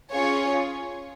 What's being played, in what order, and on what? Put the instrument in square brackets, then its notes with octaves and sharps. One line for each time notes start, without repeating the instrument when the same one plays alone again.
[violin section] C#4 F4 G#4 C#5